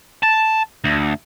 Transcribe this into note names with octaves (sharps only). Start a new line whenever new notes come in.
A5
D2